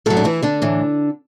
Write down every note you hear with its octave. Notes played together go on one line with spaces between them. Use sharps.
A2 F#3 A3 A4
D4
E3 E4
D3 D4
A2 E3